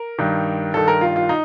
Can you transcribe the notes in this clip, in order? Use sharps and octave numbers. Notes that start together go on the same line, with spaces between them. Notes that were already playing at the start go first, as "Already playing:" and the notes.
Already playing: A#4
G2 D#3
G2 D#3 A4
A#4
F4
F4
D#4